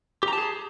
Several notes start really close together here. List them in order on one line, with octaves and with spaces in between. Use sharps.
G4 A#5 A5 G#4